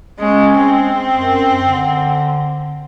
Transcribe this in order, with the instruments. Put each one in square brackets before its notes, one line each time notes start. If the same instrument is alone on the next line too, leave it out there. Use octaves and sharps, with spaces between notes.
[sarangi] G#3 [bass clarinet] C#4
[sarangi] C4
[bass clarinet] F#2
D3